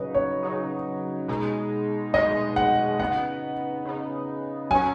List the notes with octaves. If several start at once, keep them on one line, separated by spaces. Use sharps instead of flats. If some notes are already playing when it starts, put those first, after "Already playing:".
Already playing: C#3 F#3 D#4 B4
C#5
C#3 F#3 D#4
B2 G#3 D#4
B2 G#3 D#4 D#5
F#5
C#3 B3 D#4 F#5
C#3 B3 D#4
F#3 C#4 G#5